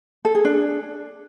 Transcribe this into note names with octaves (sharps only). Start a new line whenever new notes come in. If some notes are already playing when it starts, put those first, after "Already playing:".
A4
G#4
D4